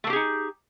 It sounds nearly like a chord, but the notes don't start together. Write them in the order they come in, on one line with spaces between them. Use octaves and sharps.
A3 A#3 G4 G#4 D#4